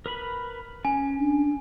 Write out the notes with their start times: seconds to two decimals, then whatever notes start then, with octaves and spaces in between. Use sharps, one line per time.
0.06 A#4 B4 B5
0.85 C#4 G#5
1.18 D4